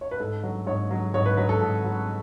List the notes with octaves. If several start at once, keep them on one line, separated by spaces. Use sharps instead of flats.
C#5
B4
G#2 A4
F#3
G#2 C#5
F#3
G#2 C#5
B4
F#3 B4
A4
G#2
F#3